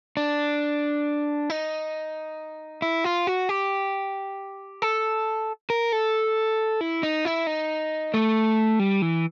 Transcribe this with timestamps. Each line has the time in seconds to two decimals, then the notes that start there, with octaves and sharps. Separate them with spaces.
0.17 D4
1.50 D#4
2.82 E4
3.04 F4
3.27 F#4
3.49 G4
4.82 A4
5.70 A#4
5.92 A4
6.81 E4
7.03 D#4
7.25 E4
7.47 D#4
8.14 A3
8.79 G3
9.02 E3